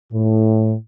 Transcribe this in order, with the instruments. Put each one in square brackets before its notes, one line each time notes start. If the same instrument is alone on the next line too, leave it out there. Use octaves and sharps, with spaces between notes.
[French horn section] A2